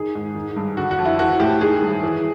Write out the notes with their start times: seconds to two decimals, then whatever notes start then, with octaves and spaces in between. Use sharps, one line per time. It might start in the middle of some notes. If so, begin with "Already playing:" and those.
Already playing: D#3 G#4
0.15 G#2
0.35 D#3
0.56 G2
0.77 D3 F#4
0.91 F#4
0.99 F2
1.05 E4
1.19 E3 F#4
1.40 A2 G4
1.61 D#3 G#4
1.82 G2
2.03 E3